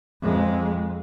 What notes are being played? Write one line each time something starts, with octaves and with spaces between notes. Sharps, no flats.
F2 G#3